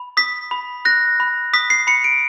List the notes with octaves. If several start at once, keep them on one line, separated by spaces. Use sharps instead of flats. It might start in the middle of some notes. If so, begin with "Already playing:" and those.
Already playing: B5
D#6 B6
B5
F#6 A#6
B5
D#6 B6
C7
B5 C#7
D7